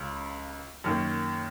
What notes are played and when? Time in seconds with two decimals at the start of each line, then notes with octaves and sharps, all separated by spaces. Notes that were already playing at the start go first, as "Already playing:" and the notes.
Already playing: C#2 C#3
0.84 F#2 D#3 A#3